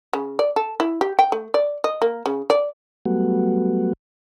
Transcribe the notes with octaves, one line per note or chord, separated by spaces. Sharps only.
C#3
D5
A4
E4
G4
G5
A3
D5
D#5
A#3
C#3
D5
F#3 G3 A3 B3 F#4